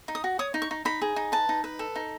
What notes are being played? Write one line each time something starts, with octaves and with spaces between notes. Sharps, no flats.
D#4
D#6
F#4
C#5 D#6
D#4
C#6
D#4
D#4 B5
G#4
D#4
B4 A5
D#4
B4
A4
D#4